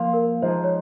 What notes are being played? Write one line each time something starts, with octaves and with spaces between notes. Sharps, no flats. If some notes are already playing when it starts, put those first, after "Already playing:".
Already playing: F3 A#3 F4
A#4
F3 G#3 D#4 C5
C#5